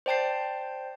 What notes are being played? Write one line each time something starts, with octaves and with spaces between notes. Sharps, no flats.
C5 D5 G5 A5 G6 C7